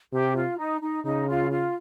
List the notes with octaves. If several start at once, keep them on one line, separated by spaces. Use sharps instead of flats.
C3 G4
F4
D#4
D#4
C#3 D#4
F4
F4